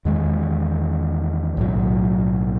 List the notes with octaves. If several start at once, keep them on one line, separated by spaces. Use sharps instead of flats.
E2 D#3 G#3
B1 A2 F#3